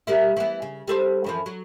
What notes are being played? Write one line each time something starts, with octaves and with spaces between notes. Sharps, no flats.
G3 A#3 E4
E3 B3
C#3
G3 A4 C5
F#2 E3 F3
F#3